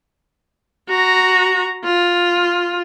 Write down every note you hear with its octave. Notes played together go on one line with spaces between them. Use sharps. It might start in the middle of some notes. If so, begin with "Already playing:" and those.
F#4 A#5
F4